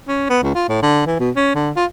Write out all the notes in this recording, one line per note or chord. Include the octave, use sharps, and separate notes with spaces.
C#4
B3
C#2
F4
A2
D3
E3
B2
C#4
D3
F4